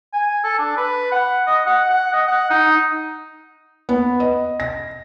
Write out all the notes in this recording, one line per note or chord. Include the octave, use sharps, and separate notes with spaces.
G#5
A4
D4
B4
F#5
D#5
F#5
F#5
D#5
F#5
D#4
B3
D#5
A#6